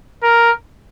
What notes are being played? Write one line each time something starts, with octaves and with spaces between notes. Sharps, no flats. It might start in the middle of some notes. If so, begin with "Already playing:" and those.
A#4